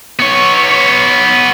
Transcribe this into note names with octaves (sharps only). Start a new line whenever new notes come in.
B3 C#5